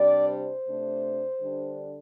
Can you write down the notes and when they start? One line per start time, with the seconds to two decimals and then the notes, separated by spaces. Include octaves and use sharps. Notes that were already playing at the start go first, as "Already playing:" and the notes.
Already playing: C3 G3 D4 D5
0.28 C5
0.66 C3 A3 D4
1.40 D3 G3 D4